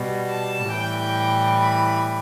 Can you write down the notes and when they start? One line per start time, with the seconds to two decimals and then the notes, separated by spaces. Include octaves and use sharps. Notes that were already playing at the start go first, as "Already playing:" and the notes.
Already playing: B2 G3
0.28 A5
0.71 A2 E3 G3 G5
1.56 B5